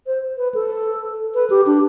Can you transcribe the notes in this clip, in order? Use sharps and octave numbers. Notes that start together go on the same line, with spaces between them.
C5
B4
A4
B4
G4
D4